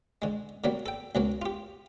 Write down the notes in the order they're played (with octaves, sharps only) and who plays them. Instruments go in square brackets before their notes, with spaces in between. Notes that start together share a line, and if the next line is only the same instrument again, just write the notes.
[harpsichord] D3 G#3
D3 F#3 G3 A#3
A4 G5
C#2 F#3 A#3
F4 G4